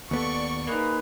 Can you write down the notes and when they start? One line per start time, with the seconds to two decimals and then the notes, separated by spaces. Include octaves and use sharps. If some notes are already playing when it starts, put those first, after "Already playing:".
0.11 D#2 B3 A4 D5 C#6
0.67 G#3 A#3 D#4 B4